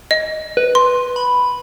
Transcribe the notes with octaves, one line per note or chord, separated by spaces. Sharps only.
D#5
B4
C6
B5